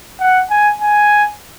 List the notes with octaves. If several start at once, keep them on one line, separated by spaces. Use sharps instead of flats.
F#5
G#5
G#5